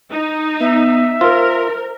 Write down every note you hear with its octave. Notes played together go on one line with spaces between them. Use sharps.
D#4
B3 E5
F4 A#4 C5